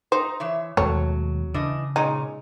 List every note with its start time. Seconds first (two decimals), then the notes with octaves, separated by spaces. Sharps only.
0.12 D#4 C5
0.40 E3 C#5 E5
0.77 D#2 B2 F#3 G#3 A3 C#5
1.54 C#3 E3 D4 D#5
1.96 A#2 G#3 C#4 D#4